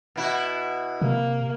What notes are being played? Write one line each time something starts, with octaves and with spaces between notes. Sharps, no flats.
B2 E4 F#4
C3 A#3